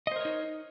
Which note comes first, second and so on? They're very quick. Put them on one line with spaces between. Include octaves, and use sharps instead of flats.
D#5 C5 A#4 C#5 D#4